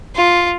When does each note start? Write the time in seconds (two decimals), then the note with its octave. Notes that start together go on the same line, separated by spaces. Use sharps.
0.16 F4